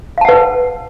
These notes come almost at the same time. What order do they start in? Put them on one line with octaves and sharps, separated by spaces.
F5 A5 F#5 B4